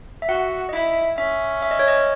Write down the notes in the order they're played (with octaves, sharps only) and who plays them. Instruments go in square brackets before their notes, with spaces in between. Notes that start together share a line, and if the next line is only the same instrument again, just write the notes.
[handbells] E5
[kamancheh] F#4 [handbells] F#5
[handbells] D#5
[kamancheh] E4 [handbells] E5
[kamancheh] C#4 [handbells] E5
[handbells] E5
D#5
C#5
D#5